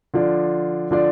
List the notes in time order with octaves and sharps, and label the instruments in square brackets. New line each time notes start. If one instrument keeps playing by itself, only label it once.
[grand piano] D3 F3 D4 F4 D5
D3 F3 D4 F4 D5